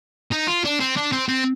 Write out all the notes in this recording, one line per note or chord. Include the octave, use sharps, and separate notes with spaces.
D#4
F4
D4
C4
D4
C4
C4